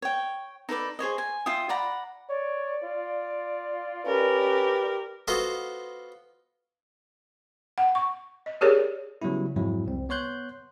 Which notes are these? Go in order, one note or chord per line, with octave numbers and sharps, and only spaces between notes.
C#5 G5
D#4 A4 B4 D5
G#4 C5 C#5 D#5
G#5
F4 E5 G5 D#6
D5 F#5 A#5 B5
C#5 D5
F4
C#4 G4 A#4 B4
B3 F4 F#4 A4 C5 D#5
F#5
C#6
D#5
G4 G#4 A#4 C#5 D5
C#3 F#3 G3 B3 E4
F2 G#2 F#3 G#3 E4
C2 C4
B3 C#5 C6 F#6 G6